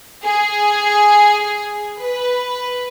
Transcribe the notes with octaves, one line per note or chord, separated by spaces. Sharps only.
G#4
B4